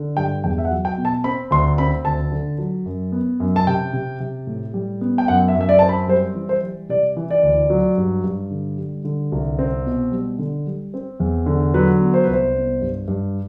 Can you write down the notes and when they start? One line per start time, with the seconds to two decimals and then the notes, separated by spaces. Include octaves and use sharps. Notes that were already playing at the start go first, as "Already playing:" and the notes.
Already playing: D3
0.17 G2 G5
0.44 E2 G5
0.58 E5
0.65 F#5
0.71 F#3
0.85 G5
0.97 B2
1.05 A5
1.24 C4 B5
1.51 D2 C6
1.78 C4 B5
2.05 D2 A5
2.32 D3
2.58 F#3
2.86 F#2
3.12 B3
3.40 F#2
3.56 A5
3.67 C3 G5
3.93 C3
4.20 C3
4.47 A2
4.74 G3
5.01 B3
5.18 G5
5.28 F#2 F#5
5.48 E5
5.55 F#2
5.61 E5
5.69 D5
5.79 C4 A5
5.89 B5
6.08 G3 C5
6.35 E3
6.49 C5
6.63 G3
6.89 C3 D5
7.17 E3
7.31 D5
7.43 D2
7.70 F#3
7.98 G2
8.24 G2
8.51 D3
8.78 G3
9.05 D3
9.32 C2
9.59 C4
9.86 B2
10.12 G3
10.39 D3
10.67 G3
10.94 C4
11.20 E2
11.46 D3
11.74 F#3 B4
12.00 B3
12.14 C5
12.24 C2 B4
12.33 C5
12.55 B3
12.82 G2
13.08 G2